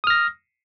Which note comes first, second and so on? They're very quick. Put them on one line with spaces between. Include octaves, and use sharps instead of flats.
D#6 F6 A#6